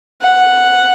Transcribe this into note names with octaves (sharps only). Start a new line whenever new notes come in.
F#5